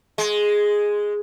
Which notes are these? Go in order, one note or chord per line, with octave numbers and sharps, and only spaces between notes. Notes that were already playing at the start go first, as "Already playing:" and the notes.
G#3